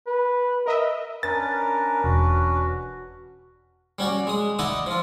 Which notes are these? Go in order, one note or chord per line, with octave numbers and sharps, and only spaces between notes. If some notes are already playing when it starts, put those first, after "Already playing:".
B4
A#4 D#5 E5
C#4 D4 A#4 B4 A6
E1 F#4
G3 C#4 F#4 D5
G#3 D#6
D#4 E4 D5 D#5 F#5 D#6
F3 F4